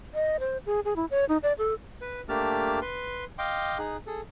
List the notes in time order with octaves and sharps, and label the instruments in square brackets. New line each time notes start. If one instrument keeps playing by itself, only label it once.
[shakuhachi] D#5
C5
G#4
G#4
E4
C#5
D#4
D5
A4
[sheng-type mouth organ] B4
A3 A#3 D4 G4 A5 F6
B4 C6
D#5 F5 G5 C6 D6
D#4 G#4 F#6
G#4 A4